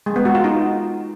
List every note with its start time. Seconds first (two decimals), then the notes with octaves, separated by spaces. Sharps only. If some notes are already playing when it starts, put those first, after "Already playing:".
0.06 G#3
0.16 B3
0.25 F#4
0.35 F4
0.44 D#4